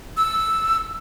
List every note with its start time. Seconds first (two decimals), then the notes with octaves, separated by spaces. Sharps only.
0.17 E6